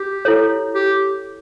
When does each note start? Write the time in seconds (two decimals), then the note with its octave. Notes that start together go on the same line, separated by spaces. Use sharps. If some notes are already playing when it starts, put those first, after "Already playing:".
Already playing: G4
0.25 E4 A4 C#5
0.75 G4